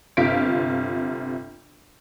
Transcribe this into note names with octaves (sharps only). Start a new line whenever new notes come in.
G1 C3 F4 B6 D7